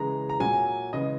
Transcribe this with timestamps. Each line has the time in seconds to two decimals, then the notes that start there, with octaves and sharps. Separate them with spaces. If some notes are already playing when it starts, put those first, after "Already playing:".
Already playing: C#3 E3 G#3 A#5
0.29 A#5
0.40 A#2 F#3 G#5
0.93 C#3 E3 G#3 D#5